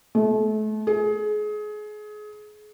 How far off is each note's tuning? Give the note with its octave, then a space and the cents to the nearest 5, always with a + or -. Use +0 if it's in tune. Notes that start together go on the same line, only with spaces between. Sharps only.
A3 -35
G#4 +25